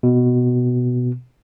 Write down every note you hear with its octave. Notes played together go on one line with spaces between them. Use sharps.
B2